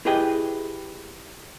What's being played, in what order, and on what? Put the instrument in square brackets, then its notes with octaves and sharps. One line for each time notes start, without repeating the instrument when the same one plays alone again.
[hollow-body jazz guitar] E4 G4 G#4 B4 D#5 G5